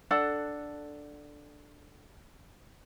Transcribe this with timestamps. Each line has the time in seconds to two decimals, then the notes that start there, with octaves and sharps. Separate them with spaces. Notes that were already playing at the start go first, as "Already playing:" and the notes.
0.11 D4 A4 F#5